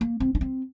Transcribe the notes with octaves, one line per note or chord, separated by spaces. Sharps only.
A#3
C4
D4
C4